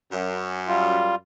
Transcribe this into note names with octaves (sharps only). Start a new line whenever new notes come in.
F#2
G3 F4